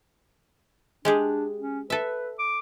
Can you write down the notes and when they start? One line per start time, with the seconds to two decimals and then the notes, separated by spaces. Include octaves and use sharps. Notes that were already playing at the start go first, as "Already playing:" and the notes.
1.05 G#3 D4 G4 G#4
1.58 C#4
1.90 A4 B4 E5
2.39 D6